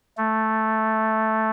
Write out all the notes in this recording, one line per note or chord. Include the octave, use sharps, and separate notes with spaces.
A3